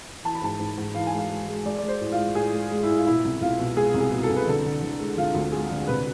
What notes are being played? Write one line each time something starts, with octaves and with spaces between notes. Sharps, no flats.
E3 A5
B5
G#2 A5
G#2
G#2
E3 F5
G#5
G#3 F5
G#3
G#3
G#3 D5
D5
G#3
C5
A2
F4
G#3
A2 G#4
G#3
G#3
E4
A2
F4
B2 E4
C2
C2 F4
B2
G#3 G#4
C2
G#4
B2
A4
C2
B4
D3 A4
D3
D3
G#3
D3 F4
D2
G#3 G#4
D3
C3 B4